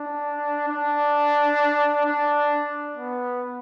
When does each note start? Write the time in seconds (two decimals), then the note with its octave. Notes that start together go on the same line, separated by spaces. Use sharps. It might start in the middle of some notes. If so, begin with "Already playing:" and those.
Already playing: D4
0.69 D4
2.06 D4
2.97 B3